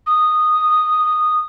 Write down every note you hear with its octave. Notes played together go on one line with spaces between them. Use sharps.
D#6